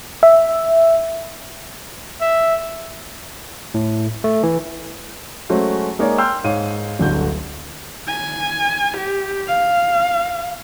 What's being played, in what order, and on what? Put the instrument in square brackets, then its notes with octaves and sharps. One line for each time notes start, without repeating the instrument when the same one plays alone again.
[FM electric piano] E5
[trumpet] E5
[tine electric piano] A2
A3
E3
[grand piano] F#3 G#3 A3 C#4 F#4 C5
G#3 A#3 D#4 C#5 D5
G5 C6 E6 F6 G6
G#2 C#5 F5 D#7
D1 G1 D3 F#4 G6
[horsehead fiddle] G#5
G4
F5